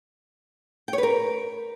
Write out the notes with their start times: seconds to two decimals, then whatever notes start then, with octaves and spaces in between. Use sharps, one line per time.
0.88 G5
0.93 C#5
0.98 B4
1.03 A#4